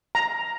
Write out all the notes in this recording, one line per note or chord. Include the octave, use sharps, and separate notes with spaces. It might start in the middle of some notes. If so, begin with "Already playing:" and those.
A#5